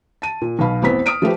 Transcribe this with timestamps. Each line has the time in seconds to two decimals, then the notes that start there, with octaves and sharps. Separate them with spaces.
0.22 A5 D#7
0.42 A#2
0.59 B1 B2 F5 B5
0.82 A1 E2 B3 C4 B6
1.06 D#6 F6 D7 D#7
1.22 F3 A3 G4 B4